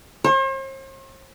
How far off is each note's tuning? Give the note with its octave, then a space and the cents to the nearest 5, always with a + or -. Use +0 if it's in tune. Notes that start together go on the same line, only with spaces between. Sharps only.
C5 +45